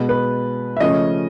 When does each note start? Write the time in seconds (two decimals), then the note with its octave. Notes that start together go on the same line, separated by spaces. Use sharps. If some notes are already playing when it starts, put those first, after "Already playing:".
Already playing: B2 G#3 B3
0.09 B4
0.77 E5
0.80 C#3 F3 A3 C#4 D#5